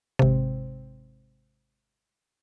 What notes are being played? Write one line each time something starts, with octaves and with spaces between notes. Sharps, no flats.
G#1 C3